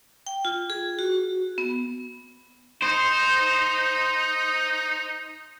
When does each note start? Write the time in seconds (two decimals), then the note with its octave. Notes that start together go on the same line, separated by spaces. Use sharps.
0.27 G5
0.45 F4
0.70 G#4
0.99 F#4
1.58 B3
2.83 D#4 C5